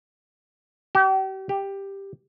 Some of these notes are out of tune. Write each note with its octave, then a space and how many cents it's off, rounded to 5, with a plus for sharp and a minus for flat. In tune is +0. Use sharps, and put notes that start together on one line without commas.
G4 -40
G4 +5